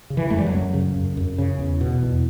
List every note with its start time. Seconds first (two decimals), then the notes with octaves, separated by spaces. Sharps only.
0.10 C#3
0.17 E3
0.30 F#2 A3
0.38 G3
0.46 F#3
0.53 F#2
0.74 C#3
0.96 F#2
1.17 F#2
1.38 C#3
1.59 E2
1.81 B2
2.03 E2